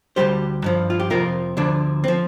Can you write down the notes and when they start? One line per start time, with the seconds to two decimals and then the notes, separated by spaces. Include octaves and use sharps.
0.16 D2 C3 G3 G4 C5
0.64 G2 F3
0.90 F4
1.00 G4
1.10 F2 C3 F3 F4 A#4
1.57 D2 D3 F3 D4
2.04 C4
2.08 F3